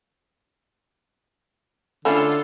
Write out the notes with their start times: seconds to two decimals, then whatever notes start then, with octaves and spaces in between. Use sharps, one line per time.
2.05 D3 A3 C#4 E4 F4 A4